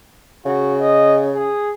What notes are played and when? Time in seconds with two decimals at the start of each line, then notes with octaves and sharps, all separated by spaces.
0.46 C#3 F#4
0.80 D#5
1.34 G#4